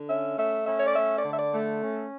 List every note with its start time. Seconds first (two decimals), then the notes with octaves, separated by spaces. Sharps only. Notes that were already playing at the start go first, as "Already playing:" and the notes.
Already playing: D3
0.09 C#4 E5
0.38 A3 E5
0.66 C#4 E5
0.78 C#5
0.87 D5
0.95 A3 E5
1.17 D5
1.24 D3
1.33 E5
1.39 D5
1.54 A3
1.82 C#4